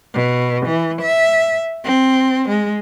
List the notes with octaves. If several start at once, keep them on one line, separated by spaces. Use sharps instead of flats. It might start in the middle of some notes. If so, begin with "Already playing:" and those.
B2
E3
E5
C4
G#3